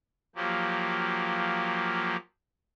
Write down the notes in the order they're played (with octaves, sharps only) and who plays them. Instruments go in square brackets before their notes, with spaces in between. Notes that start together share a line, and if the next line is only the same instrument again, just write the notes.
[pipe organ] F3 F#3 A#3 G4